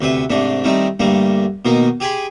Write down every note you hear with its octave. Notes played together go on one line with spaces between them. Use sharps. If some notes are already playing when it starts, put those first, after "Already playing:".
D2 C3 B4 E5
G#2 C3 A3 D4
D#3 G3 A3 C4 D#4
G2 D3 G3 A3 A#3
B2 D#3 A#3 D#4
G4 G#4 G5 G#5 B5 C6